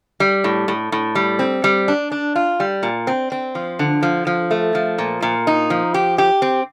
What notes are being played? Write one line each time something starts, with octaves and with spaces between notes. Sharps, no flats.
G3
A2
A2
A2
G3
C4
G3
D4
D4
F4
G3
A#2
C4
C4
F3
D3
F3
F3
A3
F3
A#2
A#2
D#4
F3
G4
G4
C4